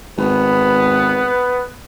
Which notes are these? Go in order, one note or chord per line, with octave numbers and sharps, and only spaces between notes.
G#1 B3 B4